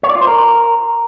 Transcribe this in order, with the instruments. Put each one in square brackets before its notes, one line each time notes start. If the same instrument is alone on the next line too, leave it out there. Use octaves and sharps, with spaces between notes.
[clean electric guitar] C#5
D5
F4
C5
A#4